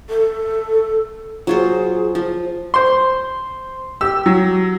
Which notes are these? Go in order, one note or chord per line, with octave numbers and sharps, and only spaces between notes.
A4
F#3 F4 G#4 C5
F3
C5 C6
G4 E6
F#3